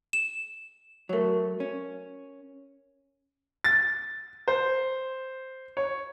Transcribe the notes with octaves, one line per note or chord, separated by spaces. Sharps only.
E7
F#3 A3 A#4 C#5
C#4
A6
C5
C#5